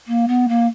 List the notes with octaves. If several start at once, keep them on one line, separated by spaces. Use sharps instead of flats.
A#3
B3
A#3